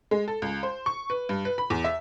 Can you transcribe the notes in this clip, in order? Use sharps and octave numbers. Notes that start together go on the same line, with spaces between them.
G#3
A4
C#2
C5
C#6
B4
G2
B4
B5
E2
E5